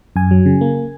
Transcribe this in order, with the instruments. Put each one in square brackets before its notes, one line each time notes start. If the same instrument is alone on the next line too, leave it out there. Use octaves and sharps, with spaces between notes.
[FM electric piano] F#2 G#5
F#3
C#3
A#3